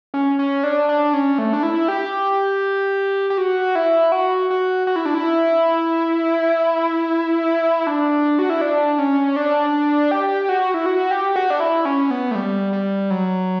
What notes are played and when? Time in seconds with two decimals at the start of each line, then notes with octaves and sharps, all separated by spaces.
0.14 C#4
0.39 C#4
0.64 D4
0.89 D4
1.13 C#4
1.38 A3
1.53 D4
1.63 E4
1.88 G4
3.30 G4
3.38 F#4
3.75 E4
4.12 F#4
4.50 F#4
4.87 F#4
4.96 E4
5.06 D4
5.14 E4
7.87 D4
8.39 F#4
8.50 E4
8.61 D4
8.99 C#4
9.36 D4
10.11 G4
10.49 F#4
10.74 E4
10.86 F#4
11.11 G4
11.36 F#4
11.50 D4
11.60 E4
11.85 C#4
12.11 B3
12.31 A3
12.35 G3
12.73 G3
13.10 F#3